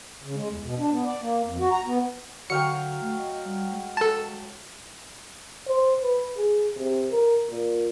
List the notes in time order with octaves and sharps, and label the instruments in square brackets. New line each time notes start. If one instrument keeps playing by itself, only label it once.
[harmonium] C#3
G#3
E2
B2
D4
B3
D5
A#3
F2
F#4
A#5
B3
[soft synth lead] D3 [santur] F#3 F5 G5 [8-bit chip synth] C#7
[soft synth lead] A3
D#5
G3
G#3
[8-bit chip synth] A4 A5
[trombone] C5
B4
G#4
C3
A#4
A#2